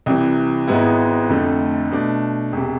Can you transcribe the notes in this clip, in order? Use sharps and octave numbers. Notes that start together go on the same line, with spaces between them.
C2 C3 E3
G#1 G#2 G#3 B3 E4
F1 F2 D3 A3
B2 A3 D4
E1 C3